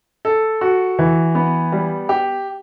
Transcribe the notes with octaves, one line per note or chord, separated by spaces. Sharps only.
A4
F#4
E3
B3
G3
G4